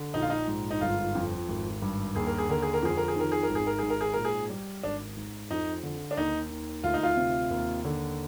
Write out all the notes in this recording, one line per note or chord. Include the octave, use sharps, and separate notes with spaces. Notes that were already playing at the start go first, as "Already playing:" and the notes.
Already playing: D3
A#1 D#4
F4
D#4
G#2
D#4
G1 F4
F2
G#1
G2
D#2 G#4
A#4
G#4
D3 A#4
G#4
A#4
F2 G#4
A#4
G#4
D#3 A#4
G#4
A#4
G#1
G#4
A#4
G#2 G#4
A#4
G#4
A#2 A#4
G#4
G3
G#1 D4
G#2
F2 D#4
D3
D4
D#2 D#4
D#3
D2 F4
D#4
F4
C3
D#2
D3